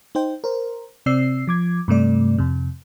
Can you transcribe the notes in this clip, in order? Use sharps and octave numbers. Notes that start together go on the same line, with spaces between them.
D#4 C5 G5
A#4 C5
C3 C4 D5 E6 C7
F3 D6 G#6
G2 C3 A3 D5
F2 C3